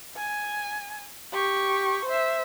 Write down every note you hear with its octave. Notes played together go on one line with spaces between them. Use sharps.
G#5
G4 C#6
C5 E5